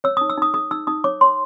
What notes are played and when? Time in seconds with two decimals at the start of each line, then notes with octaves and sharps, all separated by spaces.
0.04 C#5 E6
0.17 D#6
0.21 D#4
0.29 E6
0.37 D#4 D#6
0.54 G#4 D#6
0.71 D#4 E6
0.87 D#4 D#6
1.04 C#5 D6
1.21 C#5 C6